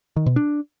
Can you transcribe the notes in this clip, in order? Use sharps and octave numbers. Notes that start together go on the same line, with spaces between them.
D#3
B2
D4